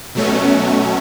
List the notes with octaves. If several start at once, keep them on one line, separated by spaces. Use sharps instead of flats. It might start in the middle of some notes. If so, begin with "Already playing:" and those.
B2 F#3 A3 C#4